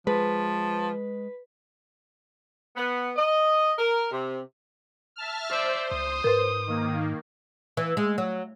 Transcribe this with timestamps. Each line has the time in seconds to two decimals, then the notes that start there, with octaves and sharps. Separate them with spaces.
0.07 F3 G#3 B4
2.76 B3
3.16 D#5
3.79 A#4
4.10 C3
5.16 E5 A5 F6
5.51 C5 D5 E5
5.91 C#2 D#6
6.24 G#2 A#4 B4
6.67 D#3 A#3
7.77 E3
7.97 G#3
8.18 F#3